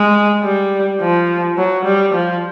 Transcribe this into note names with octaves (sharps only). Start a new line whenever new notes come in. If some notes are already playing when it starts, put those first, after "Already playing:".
Already playing: G#3
G3
F3
F#3
G3
F3